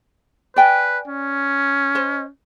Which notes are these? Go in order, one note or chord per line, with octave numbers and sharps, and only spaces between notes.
B4 D5 G5 G#5
C#4
C5 D#5